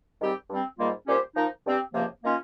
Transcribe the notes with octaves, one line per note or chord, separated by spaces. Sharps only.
G#2 D#3 G3 C4 G4
G2 G3 C4
G#2 D#3 G3 A#3 F4
A#2 G3 C#4 G4 C5
F3 A#3 D#4
G2 G3 C4 G4
C#2 C3 F3 A#3
D#3 A#3 C#4 F4